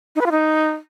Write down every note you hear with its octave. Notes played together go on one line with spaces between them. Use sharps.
D#4
B4
F4
D#4